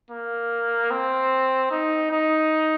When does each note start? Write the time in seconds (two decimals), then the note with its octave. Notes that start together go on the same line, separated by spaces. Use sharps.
0.10 A#3
0.91 C4
1.71 D#4
2.11 D#4